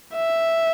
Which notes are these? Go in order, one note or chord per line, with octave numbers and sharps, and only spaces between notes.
E5